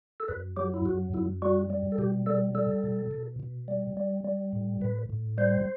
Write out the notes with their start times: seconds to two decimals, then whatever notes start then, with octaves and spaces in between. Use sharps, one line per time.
0.20 A4
0.28 F#2 B4
0.57 F#3 G4
0.74 E4
0.85 F#2 F#4
1.14 F#2 E4
1.42 G3 F#4
1.70 G3
1.92 A4
1.98 B2 G4
2.26 G3 A4
2.55 G3 A4
2.84 B2
3.11 B2
3.40 B2
3.68 G3
3.97 G3
4.24 G3
4.53 A2
4.81 A2 B4
5.10 A2
5.38 G3 C5